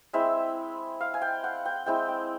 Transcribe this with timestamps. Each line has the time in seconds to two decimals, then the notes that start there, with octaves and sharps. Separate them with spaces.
0.13 G#3 C4 E4 E5
1.01 F5
1.14 G#5
1.22 G5
1.44 F#5
1.65 G5
1.86 G#3 C4 E4 G5
2.09 G5